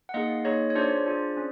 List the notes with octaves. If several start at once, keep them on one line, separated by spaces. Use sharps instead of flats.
F#5
A#3 D#4 G#4 D#5 F5
A#3 D#4 G#4 C#5 D#5
C#5
D4 F4 G#4 C5 D5
D4 F4 G#4
C#4